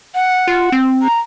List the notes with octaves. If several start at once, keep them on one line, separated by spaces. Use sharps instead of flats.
F#5
F4
C4
A#5